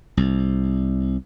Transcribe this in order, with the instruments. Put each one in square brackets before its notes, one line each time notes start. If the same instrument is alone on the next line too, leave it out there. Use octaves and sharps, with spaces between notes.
[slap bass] C2